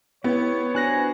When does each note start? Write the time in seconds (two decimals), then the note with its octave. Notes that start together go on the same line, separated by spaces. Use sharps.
0.24 B3 E4 G4 C#5
0.75 D4 F#4 C5 G#5 F#6 A#6